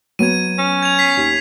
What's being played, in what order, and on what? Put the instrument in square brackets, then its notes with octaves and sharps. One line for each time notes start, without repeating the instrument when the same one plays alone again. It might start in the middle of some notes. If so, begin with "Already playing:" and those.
[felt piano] F#3 B3 [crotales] G#6 D#7
[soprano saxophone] C#4
[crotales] G#6 D#7 F7
B6 C7
[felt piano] D#2